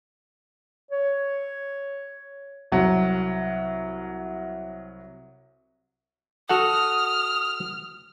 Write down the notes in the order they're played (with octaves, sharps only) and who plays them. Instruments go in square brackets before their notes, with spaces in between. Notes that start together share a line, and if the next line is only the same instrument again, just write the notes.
[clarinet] C#5
[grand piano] C2 F#3
[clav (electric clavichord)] F#4 A4 F#5 [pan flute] D#6 [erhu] F6